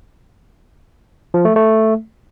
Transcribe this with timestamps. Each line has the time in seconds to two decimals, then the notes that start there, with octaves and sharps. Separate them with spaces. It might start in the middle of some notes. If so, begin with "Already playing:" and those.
1.34 F3
1.45 A3
1.56 A3